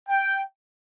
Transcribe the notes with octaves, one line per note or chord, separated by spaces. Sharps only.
G5